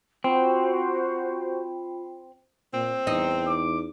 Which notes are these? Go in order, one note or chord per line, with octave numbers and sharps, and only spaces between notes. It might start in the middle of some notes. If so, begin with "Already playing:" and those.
C4 F4 F#4 C5 B5
A#2 C4
E2 D#4
D6